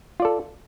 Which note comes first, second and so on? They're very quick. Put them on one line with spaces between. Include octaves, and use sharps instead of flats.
F4 D5 A4